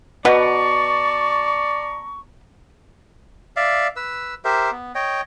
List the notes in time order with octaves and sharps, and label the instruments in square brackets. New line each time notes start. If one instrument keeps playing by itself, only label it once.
[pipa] B2 [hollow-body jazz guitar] F#4 B4 F#5 [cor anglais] D5 [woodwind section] A5 A#5 C#6
[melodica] D5 E5 F5
B4 E6
G4 A#4 C5 E5
B3
C#5 D#5 G5